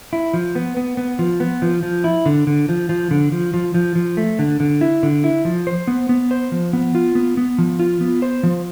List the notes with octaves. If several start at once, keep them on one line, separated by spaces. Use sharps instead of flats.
E4
F3
B3
B3
B3
F3
B3
F3
F3
E4
D3
D3
F3
F3
D3
F3
F3
F3
F3
A3
D3
D3
E4
D3
E4
F3
C5
B3
B3
C5
F3
B3
F4
B3
B3
F3
F4
B3
C5
F3